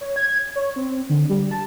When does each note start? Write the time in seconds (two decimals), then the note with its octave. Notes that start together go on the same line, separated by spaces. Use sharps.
0.01 C#5
0.16 G#6
0.56 C#5
0.76 C4
1.09 D3
1.29 G3
1.51 A5